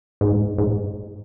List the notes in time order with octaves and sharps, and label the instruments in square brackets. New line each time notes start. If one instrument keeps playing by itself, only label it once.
[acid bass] G#2
G#2